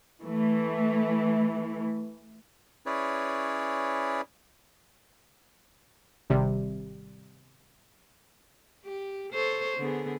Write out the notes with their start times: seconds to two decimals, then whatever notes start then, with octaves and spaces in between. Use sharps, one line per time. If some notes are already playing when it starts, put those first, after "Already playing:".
0.22 E3 A3
2.86 C#4 E4 G#4 B4 C#5 D5
6.30 G#1 C3 G3
8.85 G4
9.33 A4 C5 C#5
9.78 D3 B3 G#4